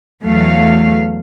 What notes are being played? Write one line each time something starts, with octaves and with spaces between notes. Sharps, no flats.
E2 F#3 A3 F5